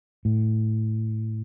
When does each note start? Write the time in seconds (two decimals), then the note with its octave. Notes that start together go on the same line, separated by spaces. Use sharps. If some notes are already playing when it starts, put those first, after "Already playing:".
0.25 A2